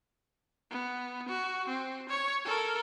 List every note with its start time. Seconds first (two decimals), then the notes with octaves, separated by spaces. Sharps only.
0.71 B3
1.29 F#4
1.68 C4
2.09 C#5
2.45 A4 A#4